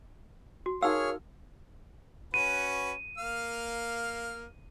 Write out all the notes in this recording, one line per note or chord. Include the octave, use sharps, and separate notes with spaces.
F#4
D#4 F#4 G#4 A#4 C#5 F5 E6 F6
C#4 F#4 B4 D#7
A#3 F5 F6